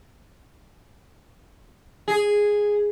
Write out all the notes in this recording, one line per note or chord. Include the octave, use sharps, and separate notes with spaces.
G#4